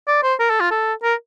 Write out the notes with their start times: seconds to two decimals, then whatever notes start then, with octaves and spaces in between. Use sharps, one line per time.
0.08 D5
0.23 C5
0.40 A#4
0.50 A4
0.60 F4
0.71 A4
1.03 A#4